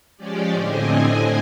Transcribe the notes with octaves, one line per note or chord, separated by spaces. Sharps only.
F3 G#3 C#4 G4 D5
A2 D3 C4 D#5 G#5